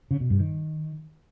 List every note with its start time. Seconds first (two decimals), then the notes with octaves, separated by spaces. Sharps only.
0.11 C#3
0.20 B2
0.30 G2
0.40 D#3